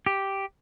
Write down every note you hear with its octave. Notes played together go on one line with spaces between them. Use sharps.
G4